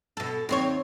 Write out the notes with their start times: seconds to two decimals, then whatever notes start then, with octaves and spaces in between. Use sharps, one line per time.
0.17 B2 A4
0.49 D#2 C4 C#5